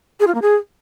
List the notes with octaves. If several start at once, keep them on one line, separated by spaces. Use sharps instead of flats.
G#4
F4
A#3
G#4